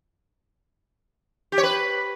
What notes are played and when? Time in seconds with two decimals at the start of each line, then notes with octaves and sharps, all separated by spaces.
1.52 G4
1.58 C#5
1.63 B4